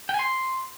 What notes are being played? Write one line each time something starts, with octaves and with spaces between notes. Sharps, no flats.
G5
G#5
C6